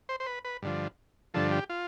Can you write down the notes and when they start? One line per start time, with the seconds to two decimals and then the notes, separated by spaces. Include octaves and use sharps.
0.09 C5
0.20 C5
0.26 B4
0.45 B4
0.62 G2 D3 F3
1.34 G2 D3 F3 A4
1.52 G4
1.69 F4